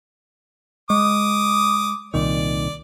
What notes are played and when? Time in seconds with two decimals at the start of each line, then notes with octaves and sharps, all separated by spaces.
0.90 G#3 D6 D#6
2.14 C2 A#2 D#3 D5